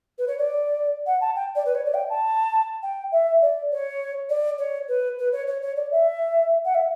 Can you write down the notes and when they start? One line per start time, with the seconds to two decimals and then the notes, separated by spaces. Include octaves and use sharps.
0.18 B4
0.28 C#5
0.39 D5
1.06 F#5
1.21 A5
1.36 G5
1.56 D5
1.66 B4
1.75 C#5
1.86 D5
1.94 G5
2.10 A5
2.83 G5
3.12 E5
3.42 D5
3.71 C#5
4.30 D5
4.59 C#5
4.89 B4
5.19 B4
5.32 C#5
5.47 C#5
5.62 C#5
5.77 D5
5.92 E5
6.65 F#5
6.75 E5